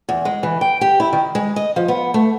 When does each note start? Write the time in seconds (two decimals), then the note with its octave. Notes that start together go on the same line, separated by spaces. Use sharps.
0.09 E2
0.25 G#3
0.43 E3
0.61 G5
0.81 G4
1.00 E4
1.13 D#3
1.35 G#3
1.56 D#5
1.76 F3
1.88 B3
2.14 A3